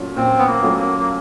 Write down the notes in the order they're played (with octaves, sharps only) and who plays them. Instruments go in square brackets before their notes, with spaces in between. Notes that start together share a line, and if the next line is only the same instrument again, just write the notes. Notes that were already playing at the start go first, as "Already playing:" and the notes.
Already playing: [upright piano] A#2 F#3 A3 C#4 F4
[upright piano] A#2 [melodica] C4
[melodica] B3
A#3
[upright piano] F#3 A3 C#4 F4
[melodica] A#3
A#3